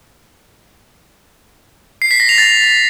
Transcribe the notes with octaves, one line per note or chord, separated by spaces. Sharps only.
C7
B6
A#6
F7
A6